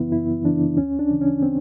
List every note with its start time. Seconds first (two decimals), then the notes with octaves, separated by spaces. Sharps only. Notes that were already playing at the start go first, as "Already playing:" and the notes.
Already playing: F#2 C#3 E3 B3 E4
0.12 F#2 E4
0.45 C#3 E3 D4
0.77 D2 C#4
0.99 D4
1.10 C#3 E3
1.21 C#4
1.42 C4